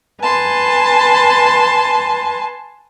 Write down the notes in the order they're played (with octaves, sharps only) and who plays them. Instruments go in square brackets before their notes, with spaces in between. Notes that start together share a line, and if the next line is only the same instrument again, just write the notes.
[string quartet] B4 G#5 A5 C6